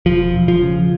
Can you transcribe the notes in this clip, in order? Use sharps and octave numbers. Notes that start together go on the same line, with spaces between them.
E1 F3
E1
F3
C#3